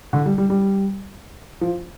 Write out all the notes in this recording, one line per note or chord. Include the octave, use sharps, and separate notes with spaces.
D3
G3
G3
G3
F3